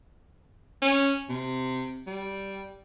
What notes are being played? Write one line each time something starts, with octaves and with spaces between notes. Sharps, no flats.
C#4
C3
G3